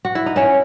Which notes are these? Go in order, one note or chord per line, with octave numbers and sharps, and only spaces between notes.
F#4
E4
D#4
C#4 E4